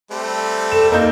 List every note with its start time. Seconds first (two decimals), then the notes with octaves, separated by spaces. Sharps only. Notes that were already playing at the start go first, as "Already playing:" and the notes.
0.11 G3 A3 C4
0.72 A4 E7
0.92 A#3 D#4 D#5 G6